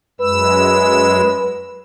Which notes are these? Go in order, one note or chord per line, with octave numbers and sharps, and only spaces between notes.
F#2 G#3 B4 E6